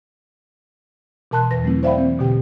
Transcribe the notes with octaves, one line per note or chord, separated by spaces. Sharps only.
B2 E3 A#4 A5 C6 F#6
E2 E3 B4 A#6
F#3 A3 C4 E4
C5 D5 E5 F5 G5 B5
E3 A#3 C4
B2 D3 G4 G5